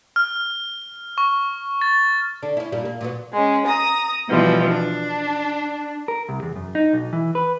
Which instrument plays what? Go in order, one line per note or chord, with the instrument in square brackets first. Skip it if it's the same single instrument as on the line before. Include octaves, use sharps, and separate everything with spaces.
[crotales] F6
C#6
A6
[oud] D3 D4
C#4 E4
G2 A#2 G3
A#3
A#2 F#3 B3
[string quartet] G#3 C#4
A#5 D#6
B2 E3 F3 G3
D4
[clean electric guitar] A#4
C2
E2
F#2
D#4
B1
E3
B4